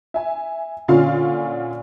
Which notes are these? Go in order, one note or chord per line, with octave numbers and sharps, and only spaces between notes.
E5 G#5
A#2 D3 C#4 F4 F5